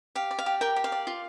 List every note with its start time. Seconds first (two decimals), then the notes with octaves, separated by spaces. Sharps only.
0.15 G4 F5
0.31 D5
0.39 F5
0.46 G4
0.61 A#4 G5
0.76 G4
0.84 F5
0.92 D5
1.07 F4